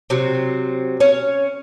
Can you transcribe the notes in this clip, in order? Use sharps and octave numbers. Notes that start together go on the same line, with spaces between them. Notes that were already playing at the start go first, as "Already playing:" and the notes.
C3 F#3 C4
C#4 C#5